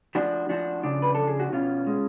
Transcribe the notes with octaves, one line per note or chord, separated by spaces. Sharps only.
F3 D4 F#4
F3 D4 F#4
C#3 D4
B4
F3 A4
G#4
F#4
B2 C#4 F4
G#3